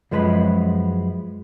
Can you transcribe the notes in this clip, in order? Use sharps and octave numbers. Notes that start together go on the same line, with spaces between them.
F#2 F3 G#3 B4 A#5 B5